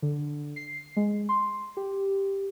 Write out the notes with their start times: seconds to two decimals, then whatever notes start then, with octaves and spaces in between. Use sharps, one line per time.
0.02 D3
0.56 C7
0.97 G#3
1.29 C6
1.77 G4